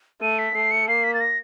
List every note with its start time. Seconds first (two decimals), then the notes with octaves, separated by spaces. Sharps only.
0.22 A3 D#7
0.38 B6
0.55 A3 C7
0.71 C#7
0.88 A#3 C7
1.04 B6
1.14 A6
1.20 A#6